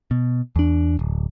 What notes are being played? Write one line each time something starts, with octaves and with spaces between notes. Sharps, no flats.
B2
E2 D4
D1